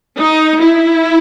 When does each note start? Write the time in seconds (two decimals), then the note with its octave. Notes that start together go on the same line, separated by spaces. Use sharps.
0.19 D#4
0.61 E4